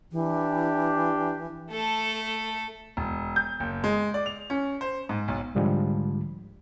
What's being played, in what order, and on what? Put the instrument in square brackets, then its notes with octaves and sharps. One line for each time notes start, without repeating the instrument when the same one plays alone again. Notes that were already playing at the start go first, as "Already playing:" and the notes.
[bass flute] E3 [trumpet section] D4 G4
[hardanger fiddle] A3 A4
[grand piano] E1
G6
F#1
G#3
D5
F7
C#4
C5
G#2
B1
[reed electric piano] C2 G#2 D3 F3 G3 G#3